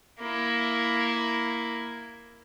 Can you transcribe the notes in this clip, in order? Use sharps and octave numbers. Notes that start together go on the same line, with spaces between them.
A#3 E4